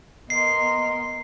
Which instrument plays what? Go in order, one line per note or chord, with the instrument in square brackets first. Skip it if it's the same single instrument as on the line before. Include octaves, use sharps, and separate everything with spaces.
[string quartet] B3 A#4 C6 [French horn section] D#5 [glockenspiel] C7